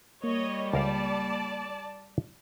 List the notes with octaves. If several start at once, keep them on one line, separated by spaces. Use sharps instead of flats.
G3 A#3 C#5 D#5
C#2 A#4 D5 F5 A5